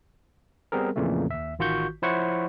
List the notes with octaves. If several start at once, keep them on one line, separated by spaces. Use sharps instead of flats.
G3 B3 C4 G#4 A#4
F2 A#2 C#3 E3 A3
D#2 E5
A1 D#3 F4 F#4 C#6 G6
F3 E4 C5 C#5 F#5 C#6